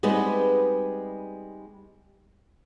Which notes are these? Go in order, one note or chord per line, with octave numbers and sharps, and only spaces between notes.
G3 G#3 B3 C4 D#4 B4